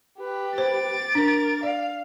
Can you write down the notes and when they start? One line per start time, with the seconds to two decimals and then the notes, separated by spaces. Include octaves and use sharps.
0.18 G4 B4
0.58 C5 D6 A6
1.15 D4 A#4
1.63 D5 F5